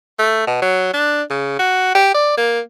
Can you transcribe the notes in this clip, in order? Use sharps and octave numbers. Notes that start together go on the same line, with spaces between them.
A3
B2
F#3
D4
C#3
F#4
G4
D5
A#3